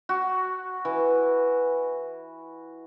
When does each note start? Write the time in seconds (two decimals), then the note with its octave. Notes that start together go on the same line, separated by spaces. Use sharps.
0.09 F#4
0.85 E3